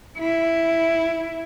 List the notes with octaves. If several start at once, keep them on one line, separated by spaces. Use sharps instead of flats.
E4